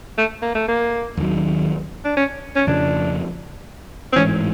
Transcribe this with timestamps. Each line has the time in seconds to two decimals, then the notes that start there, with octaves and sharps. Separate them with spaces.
0.18 A3
0.42 A#3
0.55 A3
0.68 A#3
1.17 D#2 D#3 F#3
2.05 D4
2.17 C#4
2.56 C#4
2.67 F2 C#3 F3 D4
4.13 C4
4.16 A1 G#2 E3 C#4